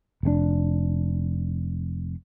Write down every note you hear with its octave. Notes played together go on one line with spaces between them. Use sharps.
F1 A2 D4